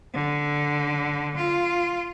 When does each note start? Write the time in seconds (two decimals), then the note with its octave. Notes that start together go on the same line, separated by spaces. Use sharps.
0.14 D3
1.35 F4